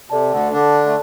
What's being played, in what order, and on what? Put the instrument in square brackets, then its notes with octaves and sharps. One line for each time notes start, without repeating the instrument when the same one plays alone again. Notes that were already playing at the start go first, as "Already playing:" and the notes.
[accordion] C3 [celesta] A4 D5 A5
[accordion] D2 D3
[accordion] D3 D4 [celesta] A4 D5 A5
[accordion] A3